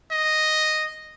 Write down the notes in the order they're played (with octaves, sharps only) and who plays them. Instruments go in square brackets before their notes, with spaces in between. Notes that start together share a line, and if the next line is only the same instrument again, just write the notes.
[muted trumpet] D#5